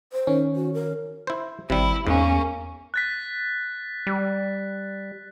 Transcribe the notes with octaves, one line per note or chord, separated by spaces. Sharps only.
C5
D#3 C#4
F#4
A#4
E4 C5
G#1 C3 G3 E4
E2 G#2 A#3 C#4
F#6 A6 B6
G3